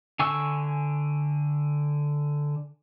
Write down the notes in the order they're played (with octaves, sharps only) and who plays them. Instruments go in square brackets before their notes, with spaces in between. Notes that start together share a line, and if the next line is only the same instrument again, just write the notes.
[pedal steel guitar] D3 G#5 C#6 E6